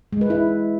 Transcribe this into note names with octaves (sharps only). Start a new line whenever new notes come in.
G#3
B4
E4